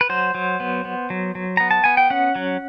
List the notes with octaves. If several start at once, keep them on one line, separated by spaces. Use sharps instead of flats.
B4
F#3 C5
F#3
B3
B3
F#3
F#3
B3 A#5
A5
B3 G#5
G5
C#4 F#5
F#3